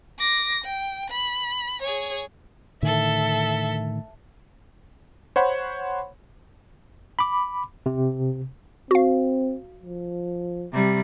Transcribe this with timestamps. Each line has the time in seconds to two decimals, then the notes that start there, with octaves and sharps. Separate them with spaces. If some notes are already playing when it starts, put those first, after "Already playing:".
0.19 D6 A#6
0.64 G5
1.10 B5
1.82 G#4 C#5
2.82 A2 D3 D#3 A4 E5
5.36 C5 C#5 F#5 B5
7.19 B5 D6
7.86 C3
8.91 C4 F#4 F5
9.82 F3
10.73 C3 G3